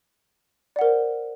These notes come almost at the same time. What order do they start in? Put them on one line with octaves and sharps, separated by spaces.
D5 F#5 A#4 C5